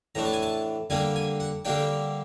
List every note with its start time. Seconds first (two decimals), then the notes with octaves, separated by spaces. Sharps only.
0.15 A2 E3 A3 D4 A#5
0.25 A5
0.33 G#5
0.42 A5
0.90 D3 G3 A#3 D4 G#5
1.16 G#5
1.40 F#5
1.65 D3 G3 A#3 D4 G5